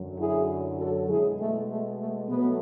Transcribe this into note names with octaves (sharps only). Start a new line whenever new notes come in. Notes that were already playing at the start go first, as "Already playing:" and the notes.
Already playing: F#2 D3 F#3
E4 G#4
F#4 A4
B2 G#3 E4 G#4
A3
A3
A3
B2 F#3 A3 B3